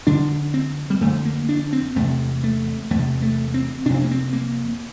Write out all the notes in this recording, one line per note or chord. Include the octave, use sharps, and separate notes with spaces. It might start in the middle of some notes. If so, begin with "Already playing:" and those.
F2 D3 D4
C4
G3
F2 D3 A3
A#3
D4
C4
E2 C3 A3
A3
E2 C3 A3
A3
C4
F2 C3 C4 D4
A#3
C4
A#3